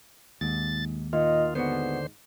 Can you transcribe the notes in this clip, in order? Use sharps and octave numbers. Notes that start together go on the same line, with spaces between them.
D#2 G#2 A6
A#2 D#3 F4 D#5
G#2 D3 B3 F#4 C5